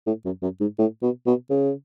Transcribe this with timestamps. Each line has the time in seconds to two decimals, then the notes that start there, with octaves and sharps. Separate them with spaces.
0.07 A2
0.25 F#2
0.42 F#2
0.60 G#2
0.79 A2
1.02 B2
1.27 B2
1.50 C#3